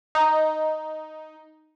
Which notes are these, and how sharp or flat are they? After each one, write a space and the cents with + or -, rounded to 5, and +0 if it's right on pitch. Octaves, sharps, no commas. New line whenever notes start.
D#4 +0